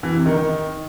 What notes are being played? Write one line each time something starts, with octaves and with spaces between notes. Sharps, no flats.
E3
C3
D#3
D#3